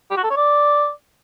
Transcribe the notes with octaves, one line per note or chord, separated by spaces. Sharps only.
G4
F#4
A4
C#5
D5